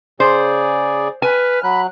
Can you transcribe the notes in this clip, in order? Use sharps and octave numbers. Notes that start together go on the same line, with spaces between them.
C#3 G#4 C5 D5
B4 G#5 F6
F#3 B5 F#6